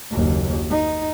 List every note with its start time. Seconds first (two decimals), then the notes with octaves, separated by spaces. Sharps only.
0.11 F#1 D#2
0.71 D#4